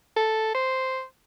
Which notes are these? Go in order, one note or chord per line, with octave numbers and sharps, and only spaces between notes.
A4
C5